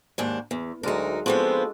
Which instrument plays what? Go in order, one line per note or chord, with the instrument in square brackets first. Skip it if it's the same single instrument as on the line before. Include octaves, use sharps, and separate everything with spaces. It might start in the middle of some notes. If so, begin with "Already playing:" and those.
[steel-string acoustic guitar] D#2 G#2 D4
E2
[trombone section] D2 [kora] F#3 G#3 D4 [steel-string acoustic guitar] D#4 A#4
[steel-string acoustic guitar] F3 B3 C4 [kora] G#3 D4 F#4 [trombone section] F4 A4